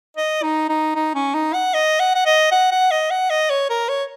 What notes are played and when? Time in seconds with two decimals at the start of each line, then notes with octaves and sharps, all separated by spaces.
0.17 D#5
0.43 D#4
0.69 D#4
0.95 D#4
1.15 C#4
1.34 D#4
1.54 F#5
1.74 D#5
2.00 F#5
2.15 F#5
2.26 D#5
2.52 F#5
2.71 F#5
2.91 D#5
3.11 F#5
3.30 D#5
3.50 C#5
3.70 A#4
3.89 C#5